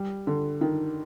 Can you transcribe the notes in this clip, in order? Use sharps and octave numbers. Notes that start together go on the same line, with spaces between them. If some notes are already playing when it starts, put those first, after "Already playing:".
Already playing: G3
D3
D#3